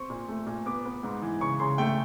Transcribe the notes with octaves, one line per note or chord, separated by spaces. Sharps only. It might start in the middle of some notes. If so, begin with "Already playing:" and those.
Already playing: C4 C#6
A#2
A3
A#2
B3 D6
B3
G#2
E3
C#3 C#6
C#3 C6
A3 G5